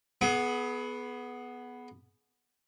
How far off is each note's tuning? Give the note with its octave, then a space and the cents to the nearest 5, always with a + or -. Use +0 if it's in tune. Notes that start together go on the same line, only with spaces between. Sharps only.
B3 +0 G#4 +30 D6 -45